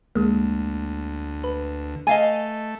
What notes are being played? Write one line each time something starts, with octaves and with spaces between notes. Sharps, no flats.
D2 G#3 A#3
B4
A3 D#5 F5 G#5